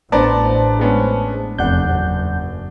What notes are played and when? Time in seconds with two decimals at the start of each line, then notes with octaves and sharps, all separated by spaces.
0.12 A1 B3 D4 C5 D5 A5 A#5
0.79 G#3 B3 C#4
1.58 F1 E2 D4 F#5 G6
1.90 F#1